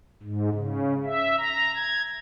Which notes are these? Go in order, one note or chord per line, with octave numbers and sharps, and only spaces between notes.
G#2
C#3
E5
A#5
G#6